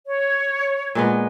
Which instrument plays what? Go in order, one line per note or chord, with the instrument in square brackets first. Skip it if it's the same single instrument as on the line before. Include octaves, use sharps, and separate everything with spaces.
[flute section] C#5
[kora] A#2 G#3 B3